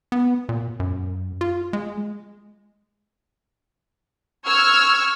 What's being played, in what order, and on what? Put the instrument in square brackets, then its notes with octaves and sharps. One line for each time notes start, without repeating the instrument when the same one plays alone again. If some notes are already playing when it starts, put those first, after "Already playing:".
[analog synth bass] B3
A#2
F#2
F4
G#3
[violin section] C#6 E6 F6 G#6